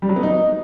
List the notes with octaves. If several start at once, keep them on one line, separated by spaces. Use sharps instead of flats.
G3
F#3
B3
D#4